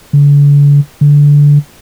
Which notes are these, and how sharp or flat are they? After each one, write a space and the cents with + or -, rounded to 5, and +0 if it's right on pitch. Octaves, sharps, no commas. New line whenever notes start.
D3 -40
D3 -15